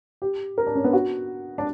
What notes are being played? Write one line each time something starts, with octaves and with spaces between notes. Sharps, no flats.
G4
A#4
D4
C#4
B3
F#4
D4